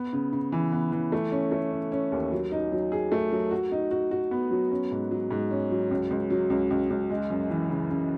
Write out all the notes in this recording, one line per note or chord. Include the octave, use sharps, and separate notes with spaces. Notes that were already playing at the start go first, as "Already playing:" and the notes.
Already playing: B3
C#3
C#3
E3
B3
E3
A3
C#4
A3
C#4
C#4
D#2
F#3
D#4
F#3
G#4
A3
F#3
F#4
D#4
F#4
F#4
B3
F#3
C#4
G#2
F#3
G#2
C#4
F#3
C#2
C#2
F#3
C#2
C#2
C#2
G#3
F#2
E3
C#3
C#3